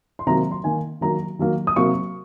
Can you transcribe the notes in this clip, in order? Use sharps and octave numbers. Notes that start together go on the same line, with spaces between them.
C6
C3 D#3 F#3 A#3 A#5
C6
D#3 A#3 G#5
D#3 F#3 A#3 A#5
D#3 F#3 A#3
D#6
C3 F#3 A#3 C#6